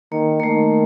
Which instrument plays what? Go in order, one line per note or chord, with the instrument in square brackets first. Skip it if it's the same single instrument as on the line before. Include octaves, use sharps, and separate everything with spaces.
[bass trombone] D#3 [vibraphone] A#3
[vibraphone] A#3
[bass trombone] D#3 [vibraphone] A3